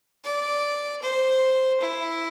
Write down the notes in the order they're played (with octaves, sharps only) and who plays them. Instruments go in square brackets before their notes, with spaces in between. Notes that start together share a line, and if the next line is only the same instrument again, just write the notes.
[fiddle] D5
C5
E4